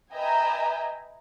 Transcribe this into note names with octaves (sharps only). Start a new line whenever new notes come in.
B4 D#5 E5 G5 G#5 A#5